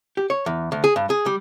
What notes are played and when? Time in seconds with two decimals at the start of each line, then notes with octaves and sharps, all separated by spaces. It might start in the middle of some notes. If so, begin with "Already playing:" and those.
0.17 G4
0.30 C#5
0.46 E2
0.72 D2
0.84 G#4
0.96 G2
1.10 G#4
1.26 G3